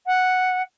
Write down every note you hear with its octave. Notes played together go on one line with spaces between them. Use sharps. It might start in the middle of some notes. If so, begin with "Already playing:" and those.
F#5